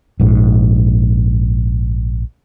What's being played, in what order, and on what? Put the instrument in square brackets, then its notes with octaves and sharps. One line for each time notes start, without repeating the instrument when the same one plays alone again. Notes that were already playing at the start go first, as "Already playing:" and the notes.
[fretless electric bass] A#1 G#2